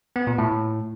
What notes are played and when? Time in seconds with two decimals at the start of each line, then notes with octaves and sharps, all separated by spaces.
0.16 B3
0.27 A#2
0.38 A2